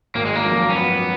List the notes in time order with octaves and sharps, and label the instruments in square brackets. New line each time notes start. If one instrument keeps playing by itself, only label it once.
[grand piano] G#1 [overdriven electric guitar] A#3
[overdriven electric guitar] G#3
A#3
[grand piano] F#2 F3
[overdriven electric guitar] C#4
[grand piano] G#1 [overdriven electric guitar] B3